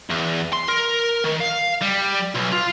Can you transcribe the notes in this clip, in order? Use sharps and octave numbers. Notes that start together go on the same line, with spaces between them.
E2
C6
A#4
D#3
F5
G3
B1
F4